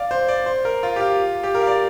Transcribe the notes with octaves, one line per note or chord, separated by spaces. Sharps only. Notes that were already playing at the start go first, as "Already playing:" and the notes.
Already playing: D5 F5
C5
D5
C5
A#4
F4
G4
F4
G4
A#4
F5
D5